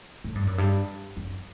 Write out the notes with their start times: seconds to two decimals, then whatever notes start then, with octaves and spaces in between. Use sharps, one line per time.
0.24 A2
0.35 G2
0.47 F#2
0.58 G2
1.17 F#2